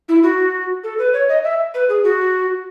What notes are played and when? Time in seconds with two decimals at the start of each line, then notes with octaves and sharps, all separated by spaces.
0.09 E4
0.23 F#4
0.84 A4
0.98 B4
1.13 C#5
1.29 D#5
1.44 E5
1.74 B4
1.89 G#4
2.04 F#4